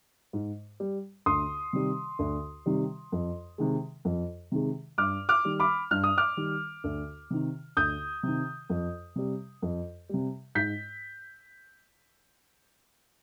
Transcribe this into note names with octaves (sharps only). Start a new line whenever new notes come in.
G#2
G3
D2 C6 D#6
C3 D#3 G3
D2
C3 D#3 G3
F2
C3 D#3 G#3
F2
C3 D#3 G#3
G2 D6 F6
D6 F6
D#3 G3
B5 D6
G2 F6
D#6
D6 F6
D#3 G3
D2
C3 D#3
D2 D#6 G6
C3 D#3
F2
C3 G3
F2
C3 G3
G#2 G6 B6